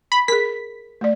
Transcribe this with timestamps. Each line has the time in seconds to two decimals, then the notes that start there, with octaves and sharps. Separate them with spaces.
0.12 B5
0.28 G#4 A#4 B6
1.01 A3 D5